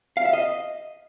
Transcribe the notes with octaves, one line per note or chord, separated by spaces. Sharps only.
F5
E5
D#5